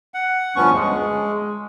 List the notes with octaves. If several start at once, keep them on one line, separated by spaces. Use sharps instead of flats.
F#5
D2 G2 F3 B3 C#4 C#6
G#3